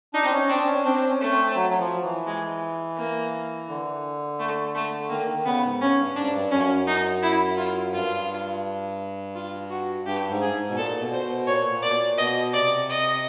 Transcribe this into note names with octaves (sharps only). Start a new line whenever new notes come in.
D4 D#4
C4
C#4
C4 D4
C#4
C4 D4
C#4
A3
C4
F#3
F#3
F3
E3
G#3
A#3
D3
A3
A3
D#3 A#3
D#3
C#3 B3
G#2
G2 C#4
G2
G#2 D4
G2
F#2 C#4
D#4
E4
F4
G2 F4
F4
F#4
G2 G4
G#2
G#4
G#2
B2
A#2 A4
B2
C5
B2
A#2 C#5
A#2
D5
B2
A#2
B2 D#5
C3 D5
D#5